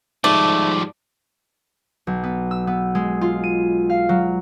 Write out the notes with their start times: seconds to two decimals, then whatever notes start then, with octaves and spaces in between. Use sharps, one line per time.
0.24 G#2 F3 G3 A3 D5
2.07 B1
2.23 B3
2.51 E6
2.67 B3
2.95 G#3
3.21 F4
3.44 D#7
3.90 F5
4.09 F#3